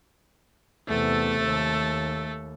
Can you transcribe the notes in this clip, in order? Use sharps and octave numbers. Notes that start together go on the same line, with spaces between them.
E2 C3 A3 A4
D#2